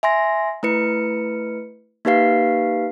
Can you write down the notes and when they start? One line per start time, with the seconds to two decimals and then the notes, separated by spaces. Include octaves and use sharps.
0.03 E5 G#5 C6 A#6
0.63 A3 E4 B4 C#7
2.05 A#3 D#4 G4 B4 F5 C7